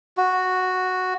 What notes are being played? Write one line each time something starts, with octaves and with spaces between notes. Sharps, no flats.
F#4